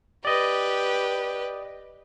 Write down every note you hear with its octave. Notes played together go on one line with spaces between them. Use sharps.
G4 B4 D5 D#5